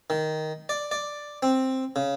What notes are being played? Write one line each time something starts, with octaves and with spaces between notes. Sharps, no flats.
D#3
D5
D5
C4
C#3